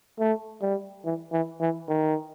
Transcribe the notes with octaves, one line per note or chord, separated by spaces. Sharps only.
A3
G3
E3
E3
E3
D#3